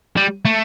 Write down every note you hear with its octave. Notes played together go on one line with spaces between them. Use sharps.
G3
A3